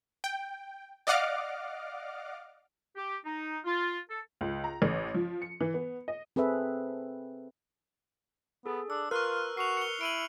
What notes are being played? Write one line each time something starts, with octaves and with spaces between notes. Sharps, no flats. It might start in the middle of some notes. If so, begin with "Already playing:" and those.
G5
D5 D#5 F5 F#5 D6 F6
G4
D#4
F4
A4
C#2
A#5
A1
F3
C#7
E3
B3
D#5
C4 G#4 A4 B4 E5
B3 G#4 A4
D4 E6
F4 A#4 B4 C#6 F6 F#6
F#4 C7 C#7 F7
C#7 G7
E4 D7 D#7 F#7